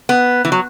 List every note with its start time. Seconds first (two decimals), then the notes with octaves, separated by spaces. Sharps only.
0.09 B3
0.45 E3
0.52 F#3